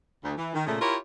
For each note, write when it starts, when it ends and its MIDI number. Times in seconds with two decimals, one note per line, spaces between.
0.23 0.32 38
0.37 0.51 52
0.54 0.64 51
0.66 0.80 46
0.66 0.80 49
0.66 0.80 57
0.80 0.96 64
0.80 0.96 65
0.80 0.96 67
0.80 0.96 70
0.80 0.96 73